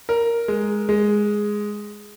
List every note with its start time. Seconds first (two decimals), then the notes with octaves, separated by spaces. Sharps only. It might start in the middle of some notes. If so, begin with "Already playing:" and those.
0.09 A#4
0.48 G#3
0.89 G#3